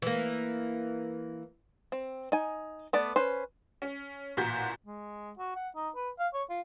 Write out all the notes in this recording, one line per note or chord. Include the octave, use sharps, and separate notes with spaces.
E3 A#3
C4
D#4 G#5
A3 B3 D5
C#4 B4 C5
C#4
A1 A#2 F#4 A#5 G6 B6
G#3
F#4
F#5
D#4
B4
F5
C#5
F4